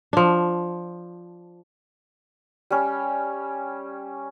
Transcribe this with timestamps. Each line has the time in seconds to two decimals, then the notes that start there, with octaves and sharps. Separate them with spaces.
0.13 F3 D4
2.70 G3 C#4